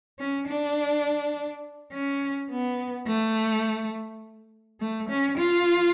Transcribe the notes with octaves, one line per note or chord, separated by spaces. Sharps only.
C#4
D4
C#4
B3
A3
A3
C#4
F4